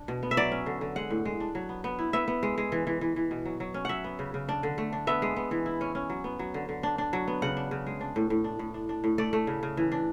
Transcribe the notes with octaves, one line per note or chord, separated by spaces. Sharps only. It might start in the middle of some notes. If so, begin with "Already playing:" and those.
Already playing: D4
B2
B3
E5
F#3 D5
C#4
D3
D3
G#3 F#5
A2
G#3
D4
F#3
B3
B3
E4
B3 E5
B3
G#3
G#3
E3
E3
E3
E3
B2
F#3
F#3
C#4
F#3 E5 F#5
B3
C#3
C#3
D4
D3
A3
D4
B3 E5
G#3
B3
E3
E4
C#4
C#4
F#3
B3
F#3
D3
D3
D4
D4
F#3
B3
C#3 F#5
D4
C#3
G#3
D4
A2
A2
D4
A2
D4
D4
A2
A3 D5
A3
C#3
C#3
E3
D4